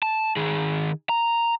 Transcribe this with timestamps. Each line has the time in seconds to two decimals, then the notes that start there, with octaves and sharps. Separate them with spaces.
0.02 A5
0.36 D#3 G#4
1.09 A#5